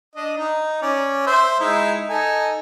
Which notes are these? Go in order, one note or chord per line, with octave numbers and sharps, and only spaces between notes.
D4 D#5
D#4
C#4 D5
C5 E5
G#3 D#4 E4
D#4 A4 G#5